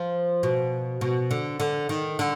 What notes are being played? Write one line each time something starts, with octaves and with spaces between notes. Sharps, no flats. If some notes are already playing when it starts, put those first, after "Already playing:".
Already playing: F3
B2
B2
D3
D3
D#3
D3